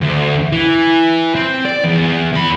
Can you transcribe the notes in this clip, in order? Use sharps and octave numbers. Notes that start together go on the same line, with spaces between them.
D2
E3
C4
D5
E2
E2 B5